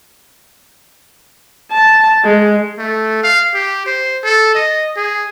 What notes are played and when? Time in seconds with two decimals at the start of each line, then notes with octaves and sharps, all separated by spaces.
1.72 A5
2.25 G#3
2.78 A3
3.23 F5
3.54 G4
3.86 C5
4.24 A4
4.55 D#5
4.97 G#4